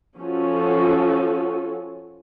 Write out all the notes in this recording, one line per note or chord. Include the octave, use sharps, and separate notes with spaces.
F3 C#4 F#4 A4